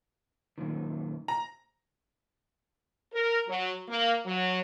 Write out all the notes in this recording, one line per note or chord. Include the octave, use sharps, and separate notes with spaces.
F#2 A#2 D#3
A#5
A#4
F#3
A#3
F#3